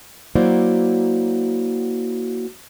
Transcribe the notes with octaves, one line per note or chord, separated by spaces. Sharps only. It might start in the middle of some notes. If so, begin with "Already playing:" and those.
F#3 A#3 E4 F#4 C5 D5